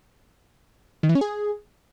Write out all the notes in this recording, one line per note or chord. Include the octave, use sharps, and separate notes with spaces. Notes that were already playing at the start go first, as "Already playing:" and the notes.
D#3
E3
C#4
G#4